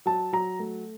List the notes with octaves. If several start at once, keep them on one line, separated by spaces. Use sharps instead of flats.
F#3 A5
F#3 A#5
A3